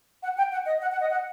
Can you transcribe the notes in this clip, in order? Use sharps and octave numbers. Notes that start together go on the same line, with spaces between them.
F#5
G5
F#5
D#5
F#5
F#5
D#5
F#5